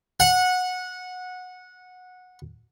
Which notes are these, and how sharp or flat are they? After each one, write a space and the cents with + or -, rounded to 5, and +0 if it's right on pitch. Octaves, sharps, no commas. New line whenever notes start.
F#5 -15